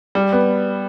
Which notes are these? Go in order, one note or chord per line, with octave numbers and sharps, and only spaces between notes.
G3
B3